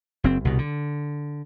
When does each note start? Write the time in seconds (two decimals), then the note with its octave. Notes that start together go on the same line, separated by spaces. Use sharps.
0.24 F#1 C4
0.45 C2 B2
0.58 D3